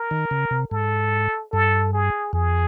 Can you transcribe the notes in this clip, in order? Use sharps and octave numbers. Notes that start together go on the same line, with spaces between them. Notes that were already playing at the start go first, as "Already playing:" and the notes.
Already playing: A#4
D#3
C#3
C3
G#2 A4
G2 A4
G#4
F2 G#4